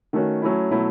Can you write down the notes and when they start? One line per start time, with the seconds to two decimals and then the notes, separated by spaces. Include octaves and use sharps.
0.13 D#3 A3 C#4 F#4
0.42 F#3 A3 C#4 E4
0.71 B2 F#3 A3 E4